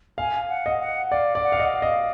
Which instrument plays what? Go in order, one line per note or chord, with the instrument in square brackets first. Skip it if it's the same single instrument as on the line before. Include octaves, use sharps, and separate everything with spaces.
[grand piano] F5 [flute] G#5
[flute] F#5
[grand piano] D#5
[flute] F#5
[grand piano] D5 [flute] F5
[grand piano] D5
[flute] F#5
[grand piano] F5
D#5
[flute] F5
[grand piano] D#5